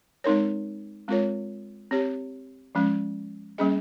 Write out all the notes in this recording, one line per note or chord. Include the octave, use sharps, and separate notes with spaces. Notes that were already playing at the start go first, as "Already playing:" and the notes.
G#3 C4 D#4 A#4 C#5
G#3 C4 F4 A#4 C#5
C4 G4 C#5
F3 G#3 C#4
G3 A#3 C#4 G#4 D#5